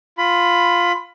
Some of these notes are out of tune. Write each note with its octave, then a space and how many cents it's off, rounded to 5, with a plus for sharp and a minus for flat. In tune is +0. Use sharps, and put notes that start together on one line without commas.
F4 +0 B5 +15